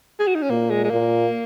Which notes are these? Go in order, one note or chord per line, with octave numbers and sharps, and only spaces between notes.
G#4
F#4
D#4
C#4
A#2 A#3
G#3
G#3
A#2 A#3